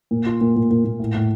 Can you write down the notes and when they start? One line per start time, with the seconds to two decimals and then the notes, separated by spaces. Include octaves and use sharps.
0.11 A#2
0.26 F4
0.41 A#2
0.56 A#2
0.71 A#2
0.85 A#2
1.00 A2
1.14 A2